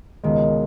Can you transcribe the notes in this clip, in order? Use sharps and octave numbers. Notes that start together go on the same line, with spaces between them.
C#2 B2 D#3 G#3